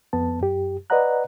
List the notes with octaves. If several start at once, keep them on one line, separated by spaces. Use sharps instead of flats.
F2 B3 A5
F#2 G4
B4 D5 D#5 F#5 A#5 F#6